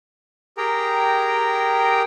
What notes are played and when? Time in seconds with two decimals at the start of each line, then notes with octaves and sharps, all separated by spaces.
0.57 G4 G#4 A#4 G5 A#5